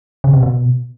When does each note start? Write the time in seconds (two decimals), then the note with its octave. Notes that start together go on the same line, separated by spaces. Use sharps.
0.24 C#3
0.33 C3
0.43 B2